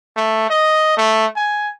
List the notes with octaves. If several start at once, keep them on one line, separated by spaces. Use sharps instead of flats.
A3
D#5
A3
G#5